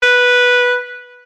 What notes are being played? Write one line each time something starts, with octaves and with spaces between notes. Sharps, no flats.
B4